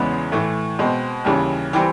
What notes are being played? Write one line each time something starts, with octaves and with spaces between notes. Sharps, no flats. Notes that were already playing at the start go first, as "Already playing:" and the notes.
Already playing: E2 C#3 E3 G#3 B3
A2 E3 A3
B2 G#3 C4
D#2 C#3 E3 G3
E3 G3 C4